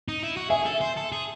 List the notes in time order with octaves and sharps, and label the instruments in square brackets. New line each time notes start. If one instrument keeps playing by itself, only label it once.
[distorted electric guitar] D#4
E4
F#4
[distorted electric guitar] G#4 [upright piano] E5 G#5
[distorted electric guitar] A4
C5
A4
G#4